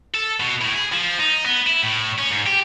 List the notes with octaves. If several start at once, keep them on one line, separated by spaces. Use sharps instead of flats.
A4
B2
A2
G#4
F3
D#4
B3
E4
A2
C#4
G#2
G4